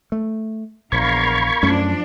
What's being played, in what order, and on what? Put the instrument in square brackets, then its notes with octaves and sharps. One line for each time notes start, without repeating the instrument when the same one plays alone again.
[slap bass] A3
[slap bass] A#1 [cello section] E2 A#4 F5 [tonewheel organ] B5 C#6 G#6
[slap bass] F#2 A3 C#4 [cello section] F3 D4